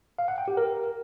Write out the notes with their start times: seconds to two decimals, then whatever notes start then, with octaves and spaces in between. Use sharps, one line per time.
0.19 F5
0.28 F#5
0.38 G5
0.48 G4
0.57 A#4